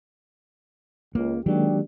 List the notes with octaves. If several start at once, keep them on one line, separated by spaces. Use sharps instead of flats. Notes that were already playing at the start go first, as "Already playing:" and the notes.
C#2 A#3
D#3 F#3 G#3 A#3 D4 G4